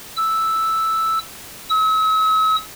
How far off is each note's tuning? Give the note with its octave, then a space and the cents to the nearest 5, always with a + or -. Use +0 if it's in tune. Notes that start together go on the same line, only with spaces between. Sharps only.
E6 -5
E6 -45